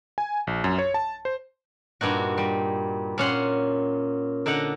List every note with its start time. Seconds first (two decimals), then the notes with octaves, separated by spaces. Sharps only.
0.18 G#5
0.47 A#1
0.64 F#2
0.78 C#5
0.94 A5
1.25 C5
2.01 G2 A#2 D#4 F#4
2.38 G3
3.18 A#2 C#4 F#5 C6
4.46 D3 D#4 D#5 F#5